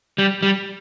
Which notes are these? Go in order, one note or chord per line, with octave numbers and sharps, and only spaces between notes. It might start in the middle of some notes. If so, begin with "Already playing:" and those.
G3
G3